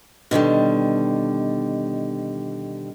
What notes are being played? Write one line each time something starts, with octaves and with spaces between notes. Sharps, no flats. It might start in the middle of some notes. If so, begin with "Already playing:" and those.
B2 D3 D#3 G3